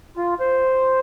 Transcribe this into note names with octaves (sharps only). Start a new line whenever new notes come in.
F4
C5